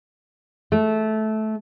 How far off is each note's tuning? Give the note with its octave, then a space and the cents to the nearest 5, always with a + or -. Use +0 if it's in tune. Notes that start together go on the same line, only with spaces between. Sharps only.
A3 -15